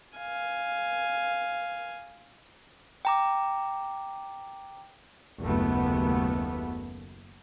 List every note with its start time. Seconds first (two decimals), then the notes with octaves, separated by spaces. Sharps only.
0.18 F5 G#5
3.05 G5 A#5 D6
5.43 F#1 D#2 A3 B3